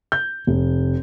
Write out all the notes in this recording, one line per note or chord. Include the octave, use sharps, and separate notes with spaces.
G6
F1